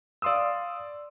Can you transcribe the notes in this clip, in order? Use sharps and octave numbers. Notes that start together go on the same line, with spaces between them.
D5 F5 C6 D#6 E6